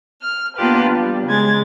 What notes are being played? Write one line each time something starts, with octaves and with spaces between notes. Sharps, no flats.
F6
A#3 B3 D4 F4 G4 B4
G3
C#3 G#3 G#6 A6